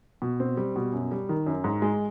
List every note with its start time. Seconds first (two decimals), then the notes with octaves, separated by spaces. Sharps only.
0.22 B2
0.40 C4
0.57 G3
0.76 B2
0.93 F#2
1.11 G3
1.29 D#3
1.46 F#2
1.64 G#2
1.82 G#3